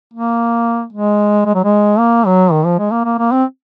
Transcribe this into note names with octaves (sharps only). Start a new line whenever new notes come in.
A#3
G#3
G#3
F#3
G#3
A#3
F#3
D#3
F3
G#3
A#3
A#3
A#3
C4